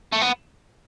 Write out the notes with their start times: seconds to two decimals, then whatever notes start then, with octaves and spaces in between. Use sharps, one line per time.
0.13 A3
0.22 B3